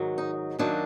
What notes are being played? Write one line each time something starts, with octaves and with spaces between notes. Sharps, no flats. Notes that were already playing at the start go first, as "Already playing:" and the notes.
Already playing: G#2 D#3 F#3
D#4
F#2 D#3 F#3 A#3 D4